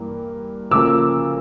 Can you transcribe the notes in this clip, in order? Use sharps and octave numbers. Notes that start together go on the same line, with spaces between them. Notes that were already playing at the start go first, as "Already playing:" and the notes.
Already playing: G2 E3 G3 A#3
D2 C#3 F3 A#3 D6 E6